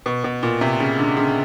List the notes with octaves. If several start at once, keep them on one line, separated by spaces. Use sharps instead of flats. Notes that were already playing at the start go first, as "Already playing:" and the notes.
B2
B2
A#2
C3
C#3
D3
C#3